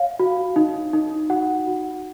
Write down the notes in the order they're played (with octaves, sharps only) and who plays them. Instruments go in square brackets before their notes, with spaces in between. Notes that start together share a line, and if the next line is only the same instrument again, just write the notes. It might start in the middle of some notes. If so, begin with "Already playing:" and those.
Already playing: [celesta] C#5 F5
F#4
D#4
D#4
F#4 F#5
F#4